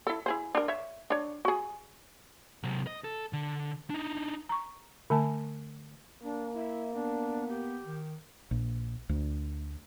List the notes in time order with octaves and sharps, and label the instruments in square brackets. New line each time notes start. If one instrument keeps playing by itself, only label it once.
[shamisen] E4 A4
E4 G#4 C5
D4 A#4
C#5 E5
D4 C#5
F#4 G#4
[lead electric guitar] C3 F#3
D#5
A4
D3
D4 D#4
[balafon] A#5 C#6
D3 A3 G#5 A5
[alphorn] A#3 [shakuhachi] D4
[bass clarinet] E4 [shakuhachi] E5
[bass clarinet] B3 [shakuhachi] D4
[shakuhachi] G4
[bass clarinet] D#3
[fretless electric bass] A#1
D2